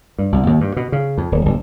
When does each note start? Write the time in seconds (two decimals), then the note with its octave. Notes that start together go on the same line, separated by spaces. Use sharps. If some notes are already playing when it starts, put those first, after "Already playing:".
0.18 G2
0.32 C2
0.47 D#2
0.61 G2
0.77 B2
0.92 C#3
1.18 F2
1.32 D#1
1.45 F#1